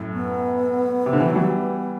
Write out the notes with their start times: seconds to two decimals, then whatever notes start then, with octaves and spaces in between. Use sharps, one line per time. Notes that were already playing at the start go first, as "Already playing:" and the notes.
Already playing: F#2 A2
0.14 B3
1.06 C3
1.13 D3
1.20 E3
1.29 F#3
1.36 E3 G3